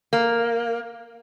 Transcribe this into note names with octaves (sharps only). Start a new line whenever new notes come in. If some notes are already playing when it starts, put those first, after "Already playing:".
A#3